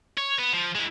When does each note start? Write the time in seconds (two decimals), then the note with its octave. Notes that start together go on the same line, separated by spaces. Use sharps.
0.18 C#5
0.38 B3
0.53 F3
0.75 G#3 E4